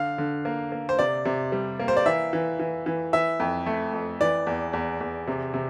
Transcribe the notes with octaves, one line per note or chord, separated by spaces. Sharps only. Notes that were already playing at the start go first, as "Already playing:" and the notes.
Already playing: D3 F5
D3
A#3
A#3
C5
C3 D5
C3
G3
A#3
C5
D5
E3 E5
E3
E3
E3
E3 E5
F2
A3
F2
E3 D5
E2
E2
E2
C3
C3